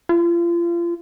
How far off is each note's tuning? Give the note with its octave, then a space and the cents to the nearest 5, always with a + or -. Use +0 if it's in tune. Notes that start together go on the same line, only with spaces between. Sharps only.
F4 -35